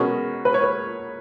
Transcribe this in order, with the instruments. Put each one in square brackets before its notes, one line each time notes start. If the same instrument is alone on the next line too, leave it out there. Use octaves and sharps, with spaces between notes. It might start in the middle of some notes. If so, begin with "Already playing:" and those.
Already playing: [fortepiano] B2 G#3 C#4 F#4 [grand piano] A#4
[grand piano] B4
C#5
B4